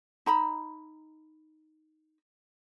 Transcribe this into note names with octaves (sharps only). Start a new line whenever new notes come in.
D#4 A#5 B5